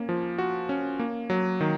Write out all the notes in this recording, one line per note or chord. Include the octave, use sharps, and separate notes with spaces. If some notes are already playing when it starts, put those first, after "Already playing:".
Already playing: A#3 C#4
F3
F#4
C#4
A#3
F#3
D#3